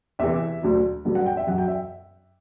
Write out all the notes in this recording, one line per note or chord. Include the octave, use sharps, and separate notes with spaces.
E2 C3 E3 E5
D2 D3 F#3
G2 D3 F#3
F#5
G5
E5
F#2 F#3 F#5
G5
E5